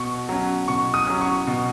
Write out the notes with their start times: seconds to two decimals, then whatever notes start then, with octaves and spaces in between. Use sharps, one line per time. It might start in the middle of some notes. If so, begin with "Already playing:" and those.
Already playing: B2 C#6
0.29 F#3 C#4
0.68 B2 C#6
0.94 D#6
1.07 F#3 C#4
1.21 C#6
1.47 B2